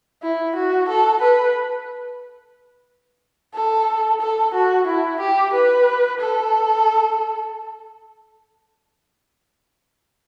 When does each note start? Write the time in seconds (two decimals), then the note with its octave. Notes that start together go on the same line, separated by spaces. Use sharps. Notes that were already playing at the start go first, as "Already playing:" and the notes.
0.23 E4
0.55 F#4
0.89 A4
1.22 B4
3.54 A4
4.21 A4
4.54 F#4
4.87 E4
5.20 G4
5.53 B4
6.20 A4